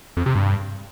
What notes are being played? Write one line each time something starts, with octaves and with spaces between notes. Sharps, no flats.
F2
C3
G2